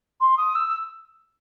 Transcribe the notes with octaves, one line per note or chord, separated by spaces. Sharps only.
C6
D#6
E6